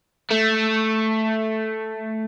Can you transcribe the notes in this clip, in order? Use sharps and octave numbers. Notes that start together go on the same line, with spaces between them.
A3